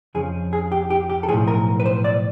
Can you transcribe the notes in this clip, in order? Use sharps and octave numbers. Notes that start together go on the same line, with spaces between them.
F2 C#3 F3 G#4
G#4
G4
G4
G4
A4
B1 A2 F3 G#4
A#4
B4
C5
D5